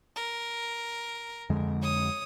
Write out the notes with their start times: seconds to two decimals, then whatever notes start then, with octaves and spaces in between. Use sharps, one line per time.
0.16 A#4
1.50 F2 D3 G#3
1.82 C#5 D#6